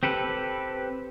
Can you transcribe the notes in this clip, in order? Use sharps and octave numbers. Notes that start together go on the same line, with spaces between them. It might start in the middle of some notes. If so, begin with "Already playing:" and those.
C4 G4 A4 B4